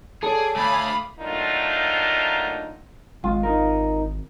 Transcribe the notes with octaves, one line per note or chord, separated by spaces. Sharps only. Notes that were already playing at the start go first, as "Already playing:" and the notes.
G#4 A4 C#5 D5 G#5
A3 D5 F5 B5 D#6
F#3 A3 A#3 D4 D#4 F4
G#1 G#3 F4
D#4 A#4